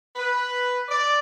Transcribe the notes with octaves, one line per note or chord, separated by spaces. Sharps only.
B4
D5